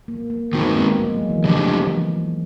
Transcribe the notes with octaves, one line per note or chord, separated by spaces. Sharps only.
A#3
A#3
D#3 G#3 B3 C4 D#4 F#4
A#3
G#3
F#3
E3
C#3 E3 F3 A3 D4 G4